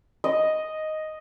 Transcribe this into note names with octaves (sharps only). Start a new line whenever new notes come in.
D#5